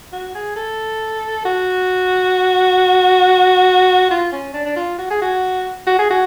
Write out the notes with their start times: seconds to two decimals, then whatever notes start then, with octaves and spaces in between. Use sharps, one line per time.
0.12 F#4
0.35 G#4
0.56 A4
1.45 F#4
4.11 F4
4.32 C#4
4.54 D4
4.66 D4
4.76 F4
4.98 F#4
5.10 G#4
5.21 F#4
5.87 F#4
5.99 G#4
6.10 F#4